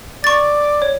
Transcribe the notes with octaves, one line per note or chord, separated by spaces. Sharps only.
D5 C#6 A6
C#5